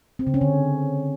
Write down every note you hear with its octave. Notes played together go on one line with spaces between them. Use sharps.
C4
C#3
C#4
D3